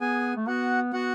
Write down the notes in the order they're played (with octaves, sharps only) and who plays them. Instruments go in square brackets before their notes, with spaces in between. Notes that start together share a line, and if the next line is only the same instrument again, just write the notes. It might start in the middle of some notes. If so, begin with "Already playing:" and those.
[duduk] B3 [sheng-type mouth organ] G#4 G#5
[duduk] A3
[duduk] B3 [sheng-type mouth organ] F#4 F#5
[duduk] B3 [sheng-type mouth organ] F#4 F#5